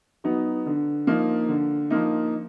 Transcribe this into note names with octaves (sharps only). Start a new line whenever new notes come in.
F#3 B3 D#4
D3
F3 A#3 D#4
D3
F3 A#3 D#4